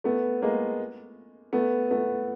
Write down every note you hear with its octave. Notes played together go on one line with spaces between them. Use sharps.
A3 B3
G#3 A#3
A3 B3
A3 B3